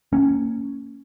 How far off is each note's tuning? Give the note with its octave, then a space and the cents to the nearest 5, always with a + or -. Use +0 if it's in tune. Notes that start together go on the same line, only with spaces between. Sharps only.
A#3 -25 C#4 +0